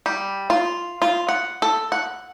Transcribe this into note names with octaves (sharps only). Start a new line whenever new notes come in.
G3
F4
F4
F#5
A4
F#5